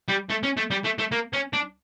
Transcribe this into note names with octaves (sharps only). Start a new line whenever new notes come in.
G3
A3
C#4
A3
G3
A3
A3
A#3
C#4
D4